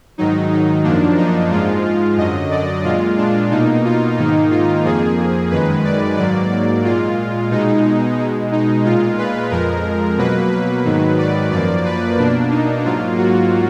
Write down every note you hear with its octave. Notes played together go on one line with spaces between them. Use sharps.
G#2 D#3 F#3 D#4
D#4
F#2 F3 A#3 D4
D#4
G#2 F3 G#3 F4
F4
F#2 D3 F#3 D#5
D5
A#2 G#3 F4
D4
B2 A#3 D#4
F4
G#2 D#3 A#3 D#4
F4
F2 F3 A#3 G#4
F#2 D#3 G#3 B4
D5
G#2 F#3 A#3 D5
D5
A#2 G#3 F4
B2 G#3 D#4
B2 G#3
D#4
A#2 G#3 F4
B4
F2 F3 G#3 A#4
B2 F#3 A#3 B4
B4
G#2 D#3 F#3
D5
F#2 F3 A#3 D5
B4
B2 A#3 D4
D#4
G#2 F#3 A#3 F4
F#4